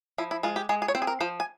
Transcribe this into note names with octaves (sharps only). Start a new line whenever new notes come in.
F3 E4
E4
G#3 F4
G4
G#3 G#4
G#4
C#5
C4 C5
G#4
A#4
F3 C5
G#5